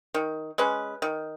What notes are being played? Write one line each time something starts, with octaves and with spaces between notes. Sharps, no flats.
D#3
G#3 C#4 B4
D#3